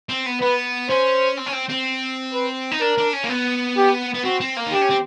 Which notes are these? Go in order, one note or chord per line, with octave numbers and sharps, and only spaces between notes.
C4
B3
B3 B4
C#4 C5
C4
C#4
C4
C4
B4
D#4
D4 A#4
D4
C#4
A#3
B3
G4
B3
C4 F#4
C4
A#3
D#4
D4 G4
C#4
C4